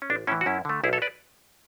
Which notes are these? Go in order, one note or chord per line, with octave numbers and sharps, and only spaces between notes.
C#4
A1 D4
A2 E3 C#4 E4
F#4
F#2 C#4 E4
D3 A3
B1 E4 G#4
A4 C#5
B4 D5